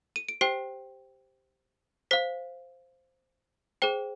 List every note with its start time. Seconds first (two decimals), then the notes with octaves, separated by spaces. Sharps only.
0.16 D#7
0.29 D7
0.41 G4 C5 G5 C7
2.11 C5 F5 B6
3.82 G#4 C5 G5